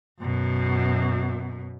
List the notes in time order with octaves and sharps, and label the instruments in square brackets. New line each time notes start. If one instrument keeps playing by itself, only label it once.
[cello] F#2 B2